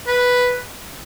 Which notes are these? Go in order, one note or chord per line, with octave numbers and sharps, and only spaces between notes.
B4